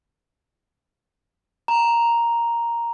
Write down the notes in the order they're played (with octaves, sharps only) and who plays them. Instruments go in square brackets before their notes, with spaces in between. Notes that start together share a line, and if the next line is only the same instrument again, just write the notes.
[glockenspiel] A#5